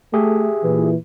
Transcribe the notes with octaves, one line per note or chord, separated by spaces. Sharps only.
A3 G4 G#4 E5
A#2 E3